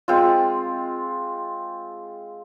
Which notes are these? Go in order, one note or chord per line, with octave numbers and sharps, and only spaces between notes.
G#3 C4 F4